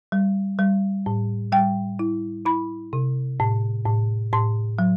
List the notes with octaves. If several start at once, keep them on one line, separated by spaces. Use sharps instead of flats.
G3
G3
A2
G3 G5
E4
E4 B5
C3
A2
A2
A2 C6
F#3